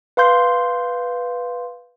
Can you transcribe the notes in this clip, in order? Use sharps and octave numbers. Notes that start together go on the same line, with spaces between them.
B4 F5 C6 G6